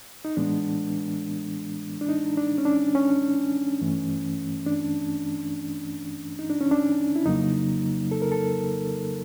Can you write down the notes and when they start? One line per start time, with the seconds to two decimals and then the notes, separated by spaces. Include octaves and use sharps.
0.25 D#4
0.37 A2 E3 G#3 B3 D4
2.01 D4
2.09 D#4
2.37 D4
2.58 C#4
2.65 D4
2.95 C#4
3.81 G2 E3 A3
4.66 D4
6.39 D#4
6.50 D4
6.61 C#4
6.71 D4
7.16 E4
7.25 F2 C#3 F#3 A#3 D#4
8.11 A4
8.22 A#4
8.32 A4